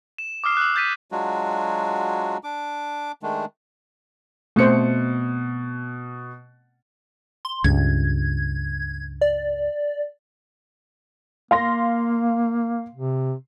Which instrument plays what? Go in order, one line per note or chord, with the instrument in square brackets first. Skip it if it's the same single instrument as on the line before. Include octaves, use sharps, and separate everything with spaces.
[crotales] E7
D6 D#6 F6 C7
E6 F#6
G6 A6 B6 D#7
[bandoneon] F#3 G#3 D4 F4 F#4
D4 D6
D#3 G#3 A3 D4
[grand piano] B2 C#7 [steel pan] A3 C4 C5
[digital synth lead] C6
[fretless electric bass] C#2 G2 [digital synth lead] G#6
[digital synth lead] D5
[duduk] A#3 [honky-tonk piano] F5 C6 A#6
[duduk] C3